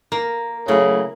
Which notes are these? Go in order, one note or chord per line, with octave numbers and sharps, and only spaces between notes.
A#3 A#4
C#3 F#3 A3 E4